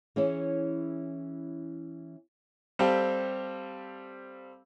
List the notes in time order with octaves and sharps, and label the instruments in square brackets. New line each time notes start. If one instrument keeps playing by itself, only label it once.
[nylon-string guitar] E3 C#4 E4 G#4 C#5
[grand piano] G3 C4 G4 A4 C5 F5